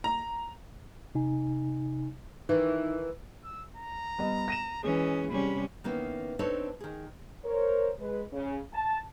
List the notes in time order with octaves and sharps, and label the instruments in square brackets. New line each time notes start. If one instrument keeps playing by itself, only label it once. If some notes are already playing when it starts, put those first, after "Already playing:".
[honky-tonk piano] A#5
[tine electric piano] C3 D#4 G#5
[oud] D#3 E3 [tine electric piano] D#4
[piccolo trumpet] E6
A#5
[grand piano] G3 B3 D#5
A#6 D#7 E7
[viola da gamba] E3 C#4 [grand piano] G#3 [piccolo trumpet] D#5
[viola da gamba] C3 G3 C#4 [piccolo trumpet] B5
[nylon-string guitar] D#3 A#3 B3 C#4 E4
C4 D4 D#4 A4 B4 C#5
D#3 G#4
[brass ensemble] A#4 C5 C#5
G#3 B4
C#3
A5